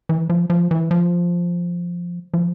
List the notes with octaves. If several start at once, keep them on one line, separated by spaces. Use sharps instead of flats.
E3
F3
F3
E3
F3
F3